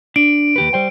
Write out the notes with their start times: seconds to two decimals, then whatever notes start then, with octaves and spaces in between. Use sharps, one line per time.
0.16 D4 D7
0.56 D#2 G4 B4
0.73 G3 C5 G5